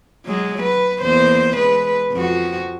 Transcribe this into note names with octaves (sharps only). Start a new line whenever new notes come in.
F#3 G#3
B4
E2 A#3 C5
G#3 B4
F2 F#4